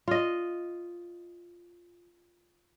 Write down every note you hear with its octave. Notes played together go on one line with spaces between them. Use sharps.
F4 D#5